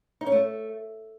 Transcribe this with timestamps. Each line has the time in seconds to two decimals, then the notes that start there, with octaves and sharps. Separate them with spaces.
0.21 D#4
0.26 C#4
0.32 A3